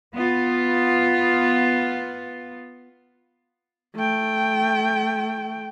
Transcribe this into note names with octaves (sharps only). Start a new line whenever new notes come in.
B3 F4
A3 G5